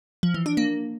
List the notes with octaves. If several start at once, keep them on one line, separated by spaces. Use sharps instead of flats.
F3
E3
D4
A#3